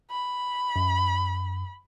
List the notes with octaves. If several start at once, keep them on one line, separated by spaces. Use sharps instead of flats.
B5
F#2